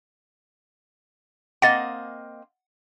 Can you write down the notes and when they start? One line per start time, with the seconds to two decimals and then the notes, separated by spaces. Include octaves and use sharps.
1.62 A#3 C4 D#5 F#5 A6